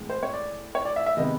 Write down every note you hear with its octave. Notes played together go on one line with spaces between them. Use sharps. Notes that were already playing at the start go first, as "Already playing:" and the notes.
Already playing: A2 E3 G#3 C4
C5
C#5
D5
C#5
D5
E5
E5
C3 D#3 G#3 B3 D#5